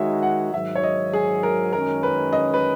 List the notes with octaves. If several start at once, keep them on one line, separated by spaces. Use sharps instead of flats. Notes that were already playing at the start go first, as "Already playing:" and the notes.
Already playing: D#3 G#3 D#4 F#4 C#5 E5
F#5
G#2 D#3 F#3 E5
C#5
D#5
G#4
A#4
F#2 D#3 G#3 C#4 A#4
B4
D#5
B4